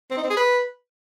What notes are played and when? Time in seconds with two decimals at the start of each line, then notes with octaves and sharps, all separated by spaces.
0.10 C4
0.17 D#4
0.24 C4
0.30 G#4
0.37 B4